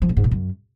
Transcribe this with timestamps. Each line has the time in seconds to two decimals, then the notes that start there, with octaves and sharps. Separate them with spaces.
0.02 F3
0.09 A2
0.17 G#2
0.24 A#2
0.31 F#2